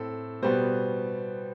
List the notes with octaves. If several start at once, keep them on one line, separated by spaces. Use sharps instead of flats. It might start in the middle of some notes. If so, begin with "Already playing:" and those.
Already playing: A2 C4 A4
B2 G3 B3 C5